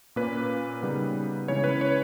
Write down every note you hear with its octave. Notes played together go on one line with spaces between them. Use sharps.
A#2 A#3 C#4 B4
C#3 G3 B3 D#4
C#3 E3 G#3 C#4 E4 C#5
B4
C#5